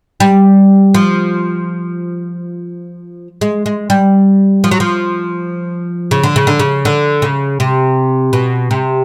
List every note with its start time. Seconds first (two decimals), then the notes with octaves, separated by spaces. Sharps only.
0.20 G3
0.94 F3
3.41 G#3
3.66 G#3
3.90 G3
4.64 F3
4.71 F#3
4.80 F3
6.11 C#3
6.24 D3
6.36 C#3
6.47 D3
6.59 C#3
6.85 D3
7.22 C#3
7.60 C3
8.33 B2
8.71 C3